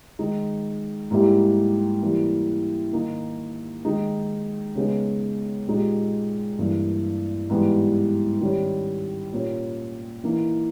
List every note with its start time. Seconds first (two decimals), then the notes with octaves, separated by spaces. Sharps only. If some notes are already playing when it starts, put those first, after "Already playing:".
0.19 D#3 G#3 D#4
1.11 G#2 G3 A#3 E4 G4
2.02 E3 G3 A#3 E4
2.93 D#3 A#3 D#4
3.85 D#3 G#3 D#4
4.75 C#3 G#3 B3 D#4
5.67 A#2 G#3 D#4 G4
6.59 G2 E3 A#3
7.50 G#2 E3 G3 B3 G4
8.41 D#3 G3 C#4
9.33 A#2 A#3 C#4 G4
10.24 E3 A#3 D#4